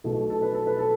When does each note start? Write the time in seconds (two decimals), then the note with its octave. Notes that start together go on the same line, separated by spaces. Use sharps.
0.04 B1 B2 F#3 A3 A4
0.30 A4
0.42 B4
0.55 A4
0.67 B4
0.79 A4